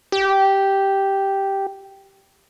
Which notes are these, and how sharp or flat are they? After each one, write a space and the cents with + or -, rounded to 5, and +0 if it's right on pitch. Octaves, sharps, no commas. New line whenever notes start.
G4 -5